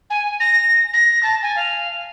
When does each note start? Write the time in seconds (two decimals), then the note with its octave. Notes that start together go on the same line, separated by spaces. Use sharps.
0.10 G#5
0.40 A#6
0.93 A#6
1.23 A5
1.42 G#5
1.56 F5